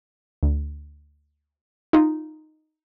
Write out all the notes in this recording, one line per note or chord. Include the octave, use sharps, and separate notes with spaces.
D2
D#4 F4